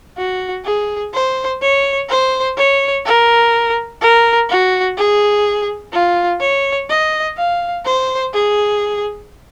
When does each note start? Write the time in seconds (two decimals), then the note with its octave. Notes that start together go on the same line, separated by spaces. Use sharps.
0.18 F#4
0.65 G#4
1.13 C5
1.62 C#5
2.09 C5
2.58 C#5
3.05 A#4
4.01 A#4
4.50 F#4
4.97 G#4
5.93 F4
6.41 C#5
6.89 D#5
7.38 F5
7.85 C5
8.34 G#4